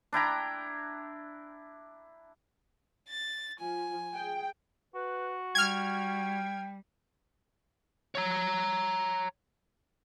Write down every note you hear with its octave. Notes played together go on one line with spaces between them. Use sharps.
D4 E4 G5 A#5
A6
F3 G#5
G#4 G5
F#4 B4
G3 G5 F6 G#6
C#5 A#5